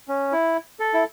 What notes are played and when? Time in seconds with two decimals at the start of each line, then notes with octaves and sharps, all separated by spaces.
0.08 C#4
0.32 E4
0.80 A4
0.94 E4